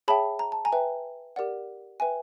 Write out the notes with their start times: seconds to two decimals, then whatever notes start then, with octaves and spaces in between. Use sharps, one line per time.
0.08 G#4 C#5 E5 G5 A5 B5
0.39 A#5
0.52 A5
0.65 G#5 A#5
0.72 B4 E5 G5
1.36 G4 A#4 D5 F#5
2.00 B4 E5 G5 G#5